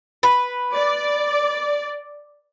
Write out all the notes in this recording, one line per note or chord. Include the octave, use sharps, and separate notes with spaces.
B4
D5